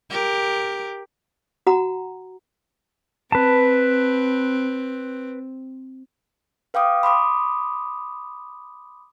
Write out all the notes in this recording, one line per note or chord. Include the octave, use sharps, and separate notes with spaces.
G4 A#4
F#4 F#5 A#5
C4 B4 A5
B4 F5 G5 D6 D#6
B5 C6 D6 D#6